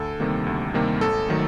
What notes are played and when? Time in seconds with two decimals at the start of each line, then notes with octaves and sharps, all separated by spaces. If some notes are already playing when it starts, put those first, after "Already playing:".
Already playing: D2 A4
0.20 C3 D#3 G3 A#3
0.47 D2
0.74 C3 D#3 G3 A#3
1.01 G#1 A4
1.29 D#3 F#3 A3